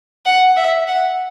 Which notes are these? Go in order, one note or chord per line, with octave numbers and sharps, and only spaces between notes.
F#5
E5
F#5